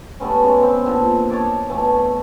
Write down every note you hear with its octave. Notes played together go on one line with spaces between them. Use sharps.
G3 A3 B3 C#4
C#3 G#3 C#4
B3 C4
A#2 D3
C#5 D#5 A5 D6
B2 E3 A3